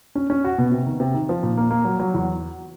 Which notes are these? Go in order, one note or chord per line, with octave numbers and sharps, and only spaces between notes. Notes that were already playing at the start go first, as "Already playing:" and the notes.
C#4
C#4
F#4
B2
C3
D#3
C3
D#3
F3
A#2
A#3
A#3
F#3
F#3
E2